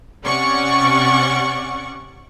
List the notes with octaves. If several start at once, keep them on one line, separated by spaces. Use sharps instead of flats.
C3 C#4 D5 F#5 C#6